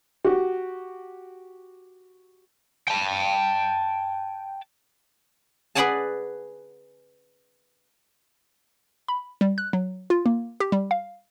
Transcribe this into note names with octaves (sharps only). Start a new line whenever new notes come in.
F#4 G4
G5 A5
G#4 B4 D5 F#5 G#5 A5
B5
G3
F#6
F#3
F4
A#3
G4
G3
F5